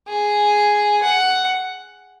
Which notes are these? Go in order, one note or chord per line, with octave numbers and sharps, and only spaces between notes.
G#4
F#5